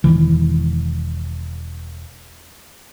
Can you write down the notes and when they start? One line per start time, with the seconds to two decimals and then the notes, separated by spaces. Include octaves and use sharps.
0.04 E1 C3 D#3 E3